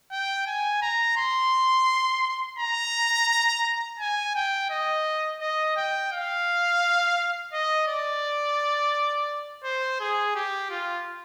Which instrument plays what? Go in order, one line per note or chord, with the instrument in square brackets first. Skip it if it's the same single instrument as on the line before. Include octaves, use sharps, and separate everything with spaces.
[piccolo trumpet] G5
G#5
A#5
C6
A#5
G#5
G5
D#5
D#5
G5
F5
D#5
D5
C5
G#4
G4
F4